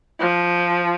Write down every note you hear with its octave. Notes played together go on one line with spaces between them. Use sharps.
F3